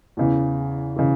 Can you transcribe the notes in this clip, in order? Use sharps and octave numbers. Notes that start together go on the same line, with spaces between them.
E2 C#3 E3
C#3 E3